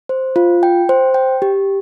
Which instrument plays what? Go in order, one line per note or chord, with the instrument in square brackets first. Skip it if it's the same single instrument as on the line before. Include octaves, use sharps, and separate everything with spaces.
[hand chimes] C5
F4
G5
C5
G5
G4